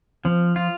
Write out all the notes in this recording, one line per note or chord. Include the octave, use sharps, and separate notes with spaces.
F3 C4
F4